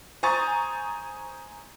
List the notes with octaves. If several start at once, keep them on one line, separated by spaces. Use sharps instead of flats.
C5 G#5 A#5 C#6 D#6 A6